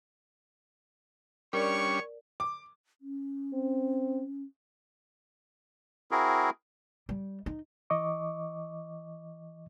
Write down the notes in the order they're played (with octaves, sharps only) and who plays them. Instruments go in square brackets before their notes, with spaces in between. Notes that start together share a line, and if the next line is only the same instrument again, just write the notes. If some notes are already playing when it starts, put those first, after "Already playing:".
[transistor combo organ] G3 C#4 D4 [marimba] A#4 D5 [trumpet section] C#5 C#6
[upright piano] D6
[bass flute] C#4
[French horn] C4
[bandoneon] C4 E4 F#4 G#4 A#4
[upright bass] G3
D#4
[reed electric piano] E3 D#5 C#6 D6